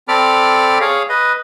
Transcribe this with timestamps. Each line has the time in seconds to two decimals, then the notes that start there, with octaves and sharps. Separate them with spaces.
0.08 C4 A4 D5 B5 D6 F6
0.81 G#4 C#5 F5
1.09 B4 D#5